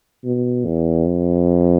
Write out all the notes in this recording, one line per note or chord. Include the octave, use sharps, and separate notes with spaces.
B2
E2
F2